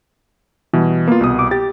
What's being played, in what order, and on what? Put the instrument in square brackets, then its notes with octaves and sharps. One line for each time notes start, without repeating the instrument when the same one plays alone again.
[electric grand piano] B2 [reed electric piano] E3 G3
[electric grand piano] A#3 F4 [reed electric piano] B3
[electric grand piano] C2 B2 D#6
[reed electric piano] D6
[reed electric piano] G4 [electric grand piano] A6